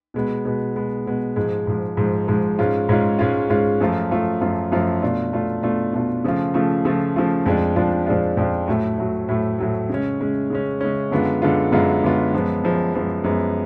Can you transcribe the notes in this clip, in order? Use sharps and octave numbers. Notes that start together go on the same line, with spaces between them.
B2 G#3 B3
B2 G#3 B3
B2 G#3 B3
B2 G#3 B3
G#2 F3 G#3
G#2 F3 G#3
G#2 F3 G#3
G#2 F3 G#3
G#2 G#3 C#4 F4
G#2 G#3 C#4 F4
G#2 G#3 C#4 F4
G#2 G#3 C#4 F4
F#2 F3 A3 F4
F#2 F3 A3 F4
F#2 F3 A3 F4
F#2 F3 A3 F4
B2 A3 D4 F4
B2 A3 D4 F4
B2 A3 D4 F4
B2 A3 D4 F4
C#3 F3 A3 F4
C#3 F3 A3 F4
C#3 F3 A3 F4
C#3 F3 A3 F4
F2 F3 G#3 D4 F4
F2 F3 G#3 D4 F4
F2 F3 G#3 D4 F4
F2 F3 G#3 D4 F4
A2 F#3 A3
A2 F#3 A3
A2 F#3 A3
A2 F#3 A3
C#3 G#3 C#4
C#3 G#3 C#4
C#3 G#3 C#4
C#3 G#3 C#4
F#2 D3 G#3 B3 F4
F#2 D3 G#3 B3 F4
F#2 D3 G#3 B3 F4
F#2 D3 G#3 B3 F4
F#2 F3 G#3 B3
F#2 F3 G#3 B3
F#2 F3 G#3 B3
F#2 F3 G#3 B3